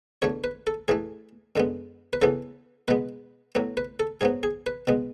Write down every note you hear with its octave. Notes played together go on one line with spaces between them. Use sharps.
E2 D3 A3 C#5
B4
A4
A2 E3 A3 G#4
F#2 D3 G#3 B3
B4
C#3 E3 B3 A4
B2 G#3 B3 B4
A2 F#3 B3
B4
A4
G#2 F#3 B3 G#4
G#4
B4
B2 G#3 B3